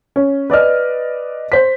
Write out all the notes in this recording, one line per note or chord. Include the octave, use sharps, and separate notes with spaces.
C#4
B4 D5 D#5 F6
C5 B6